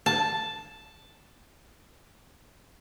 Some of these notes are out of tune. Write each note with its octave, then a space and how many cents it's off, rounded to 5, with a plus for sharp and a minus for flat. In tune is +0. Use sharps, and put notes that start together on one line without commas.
A5 +0